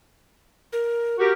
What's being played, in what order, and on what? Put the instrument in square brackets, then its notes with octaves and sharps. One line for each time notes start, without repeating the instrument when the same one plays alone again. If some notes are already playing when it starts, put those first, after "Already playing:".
[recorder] A#4
[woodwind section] F#4 G4 A#4